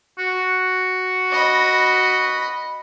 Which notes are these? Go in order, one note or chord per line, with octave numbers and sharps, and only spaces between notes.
F#4
D#5 B5